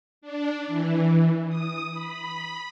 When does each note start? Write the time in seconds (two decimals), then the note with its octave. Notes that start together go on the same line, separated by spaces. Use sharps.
0.22 D4
0.67 E3
1.48 D#6
1.92 B5